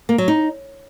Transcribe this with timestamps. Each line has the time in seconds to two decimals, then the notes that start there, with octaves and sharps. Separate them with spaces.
0.09 A#3
0.18 F#3
0.28 D#4